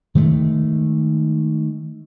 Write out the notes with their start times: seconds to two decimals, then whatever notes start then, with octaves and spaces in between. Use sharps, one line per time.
0.15 D#3 G#3 A3